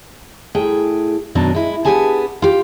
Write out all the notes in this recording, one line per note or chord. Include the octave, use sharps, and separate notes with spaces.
A2 G#4 G5
F#2 B2 D#3 F#3 D4
G#3 E4
B3 D4 G4 G#4 G#5 A5
F4 G4